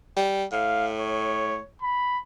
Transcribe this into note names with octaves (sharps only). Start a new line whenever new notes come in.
G3
A2 F5
C#5
B5